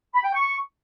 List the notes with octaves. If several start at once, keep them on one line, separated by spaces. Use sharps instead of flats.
B5
G5
C#6